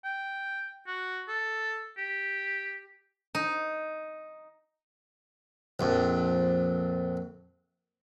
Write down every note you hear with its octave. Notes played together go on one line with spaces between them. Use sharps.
G5
F#4
A4
G4
D#4
A#1 F2